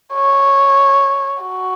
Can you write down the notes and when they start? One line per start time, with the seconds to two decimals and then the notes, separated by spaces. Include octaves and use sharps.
0.14 C#5
1.43 F#4